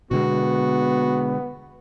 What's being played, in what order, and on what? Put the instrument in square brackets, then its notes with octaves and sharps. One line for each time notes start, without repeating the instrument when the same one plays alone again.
[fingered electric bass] B2 D3 G#3 [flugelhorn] B3 [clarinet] F#4